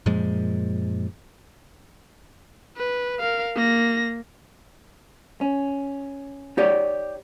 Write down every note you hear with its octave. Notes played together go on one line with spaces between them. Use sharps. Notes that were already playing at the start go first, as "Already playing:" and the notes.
F#2 A#2 F3 G#3
B4
A#4 F5
A#3 A#6
C#4
D#4 G4 C#5 D5